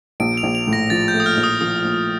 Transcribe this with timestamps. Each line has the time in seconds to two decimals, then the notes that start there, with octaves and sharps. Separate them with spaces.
0.20 A#1 D7
0.37 F7
0.43 A#1
0.55 F7
0.67 A2
0.73 A#6
0.90 F3 A6
1.08 G6
1.14 A3
1.20 D#6
1.26 F6
1.37 A#1
1.44 D#6
1.61 F3 D#6
1.85 A#1